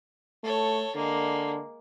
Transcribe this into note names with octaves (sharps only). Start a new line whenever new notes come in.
A3 A4 C#5
D3 G#3 A#3